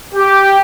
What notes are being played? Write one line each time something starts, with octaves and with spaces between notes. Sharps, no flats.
G4